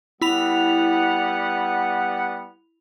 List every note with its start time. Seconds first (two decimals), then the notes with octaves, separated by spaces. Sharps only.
0.21 G3 B3 E4 F#5 B5 F7